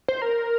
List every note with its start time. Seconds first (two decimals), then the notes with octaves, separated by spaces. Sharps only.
0.08 C5
0.22 A#4